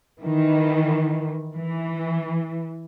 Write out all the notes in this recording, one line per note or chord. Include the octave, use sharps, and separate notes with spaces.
D#3 E3
E3